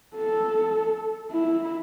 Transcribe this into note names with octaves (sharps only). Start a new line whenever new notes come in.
A4
E4